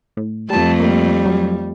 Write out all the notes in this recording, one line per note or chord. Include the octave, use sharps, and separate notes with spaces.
A2
F2 G3 A3 A5
G3 A#3
F#3